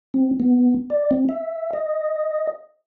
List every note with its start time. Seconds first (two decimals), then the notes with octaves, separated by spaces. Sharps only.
0.14 C4
0.40 B3
0.90 D5
1.11 C4
1.29 E5
1.73 D#5